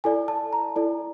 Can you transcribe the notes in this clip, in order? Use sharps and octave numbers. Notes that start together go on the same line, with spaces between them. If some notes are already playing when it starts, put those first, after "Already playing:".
E4 A4 D5 G#5
A5
A#5
E4 A4 D5